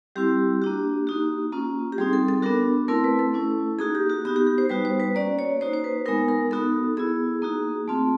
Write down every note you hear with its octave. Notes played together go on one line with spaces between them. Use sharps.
G3 C4 E4 G4
A#3 D4 F#4
A#3 D#4 F#4
A#3 C#4 F4
G4
G3 C4 D#4 G#4
A4
A4
B3 D4 F#4 A#4
A3 C4 E4 A#4
B4
A4
A3 C#4 E4
A#3 D#4 F#4 G#4
G4
F#4
B3 D#4 F#4 G4
G4
G4
C5
G3 B3 D#4 F#4 B4
C5
B4
A#3 C#4 F#4 D5
C#5
A#3 D#4 F#4 C5
C5
B4
G#3 B3 D#4 A#4
A#4
B3 D#4 F#4 A4
B3 E4 G#4
A#3 D#4 F#4
A3 C4 F4